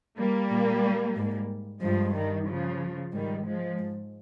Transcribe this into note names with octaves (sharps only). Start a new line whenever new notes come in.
G3 A#3
A#2
G#2
G2 F3 G#3
D#3 G3
C#3 F3
G#2 D#3 G3
F3 G#3
G#2